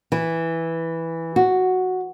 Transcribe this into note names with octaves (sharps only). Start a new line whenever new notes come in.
E3
F#4